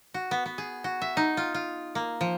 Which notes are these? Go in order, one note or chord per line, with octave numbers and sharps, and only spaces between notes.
F#4
B3
B3
G#4
F#4
E5
D#4
F4
F4
A#3
F3